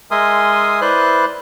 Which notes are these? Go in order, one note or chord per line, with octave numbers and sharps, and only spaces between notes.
G#3 A#4 E5 G#5 C6 D#6
E4 B4 C5 D5 C6 F#6